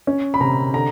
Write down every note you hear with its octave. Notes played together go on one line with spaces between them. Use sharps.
C#4
B5
C3 A#5
D3 A#5